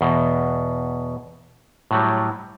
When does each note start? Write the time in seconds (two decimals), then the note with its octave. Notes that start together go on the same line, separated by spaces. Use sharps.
0.01 E2 B2
1.91 A2 F#3 G3